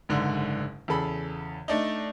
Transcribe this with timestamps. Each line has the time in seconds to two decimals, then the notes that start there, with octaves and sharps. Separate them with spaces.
0.09 F#1 G#2 D3
0.88 E2 C#3 G#4 A4 B5
1.68 A3 D4 D#4